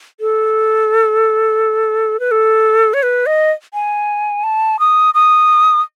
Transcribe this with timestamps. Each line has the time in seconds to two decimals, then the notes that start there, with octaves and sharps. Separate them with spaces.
0.20 A4
2.20 B4
2.31 A4
2.94 C#5
3.03 B4
3.26 D#5
3.73 G#5
4.44 A5
4.79 D#6
5.14 D#6